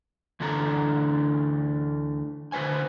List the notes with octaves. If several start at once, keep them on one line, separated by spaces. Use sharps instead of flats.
D2 D3 E3 D4 A4 A#5
D3 F#4 B4 C5 G#5